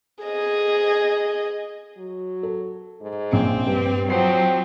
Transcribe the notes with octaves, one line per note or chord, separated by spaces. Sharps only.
G#4 D#5
F#3
A4
G#2
A#1 C4 C#4
G2 G4
F3 F#3 C4 F#5 C7